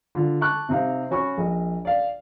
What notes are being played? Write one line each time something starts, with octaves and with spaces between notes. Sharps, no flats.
D3 F4
A5 C#6 D6 F#6
C3 C4 D#4 G4 F5
C#4 F#4 B5 C#6
A#1 D#5
D5 F5